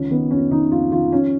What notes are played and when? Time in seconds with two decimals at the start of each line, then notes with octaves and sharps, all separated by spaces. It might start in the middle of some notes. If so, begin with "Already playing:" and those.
Already playing: C#2 D#3 C#4
0.10 D#3 B3
0.31 F2 C#4
0.51 D#3 D#4
0.71 F2 F4
0.92 D#3 F4
1.12 F3 C#4